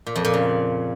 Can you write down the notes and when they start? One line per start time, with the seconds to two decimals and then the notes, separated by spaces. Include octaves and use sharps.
0.07 A#2
0.16 F2
0.25 A#2
0.34 C#3